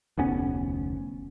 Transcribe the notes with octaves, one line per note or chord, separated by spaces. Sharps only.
F1 D2 B3 C#4